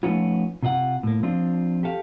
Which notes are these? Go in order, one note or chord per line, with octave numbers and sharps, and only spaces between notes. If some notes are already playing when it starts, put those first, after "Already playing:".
F3 A3 B3 C#4 D#4 F4
C3 F4 D#5 F#5
A2 A#3
F3 C4 D4 F4
G4 A4 F5